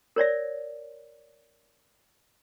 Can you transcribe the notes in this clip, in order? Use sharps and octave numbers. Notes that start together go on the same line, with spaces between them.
A#4 C#5 D5 E5